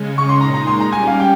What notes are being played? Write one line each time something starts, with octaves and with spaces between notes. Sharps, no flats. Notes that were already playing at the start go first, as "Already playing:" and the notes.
Already playing: C#3 G#3 C#4
C#6
C6
A#2 G#3 D#4 A#5
A#5
C6
A#5
G3 C#4 G4 G#5
F5
G5